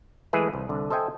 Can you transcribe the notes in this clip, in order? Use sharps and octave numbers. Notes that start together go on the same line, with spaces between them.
E3 G#3 A3 G#4 B4 E5
C2
C2 D3
A4 C5 D#5 E5 G5 G#5